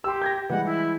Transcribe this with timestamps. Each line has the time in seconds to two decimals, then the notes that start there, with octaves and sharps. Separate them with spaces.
0.04 G4 C6 E6
0.22 G6 G#6 A#6
0.50 E3 G3 G#3 F#5
0.66 E4